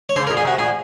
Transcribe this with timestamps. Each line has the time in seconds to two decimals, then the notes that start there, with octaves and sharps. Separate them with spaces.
0.09 C#5
0.16 C#3 C5
0.27 A#4
0.30 A#2
0.37 G#4
0.45 C3 F#4
0.59 A#2 G#4